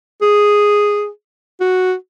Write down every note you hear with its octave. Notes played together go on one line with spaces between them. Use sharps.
G#4
F#4